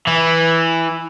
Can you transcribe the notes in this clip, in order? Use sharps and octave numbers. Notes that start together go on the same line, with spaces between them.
E3